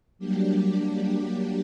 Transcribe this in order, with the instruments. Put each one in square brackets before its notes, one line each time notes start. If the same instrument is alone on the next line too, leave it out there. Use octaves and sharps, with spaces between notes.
[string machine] F#3 G3 A#3 D4 G4